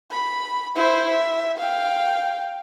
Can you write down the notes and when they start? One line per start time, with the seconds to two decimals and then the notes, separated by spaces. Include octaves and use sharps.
0.11 B5
0.75 E4 C5
1.10 E5
1.58 F5 G5